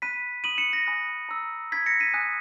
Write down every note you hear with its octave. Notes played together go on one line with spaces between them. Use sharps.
B5 F#6 B6 D#7
B5 D#6 F#6 D#7 F#7
C#7 E7
A#6
G#5 B5 D#6 F#6
A#5 E6
B5 F#6 G#6 B6
A#6 C#7
B6 D#7
G#5 D#6 F#6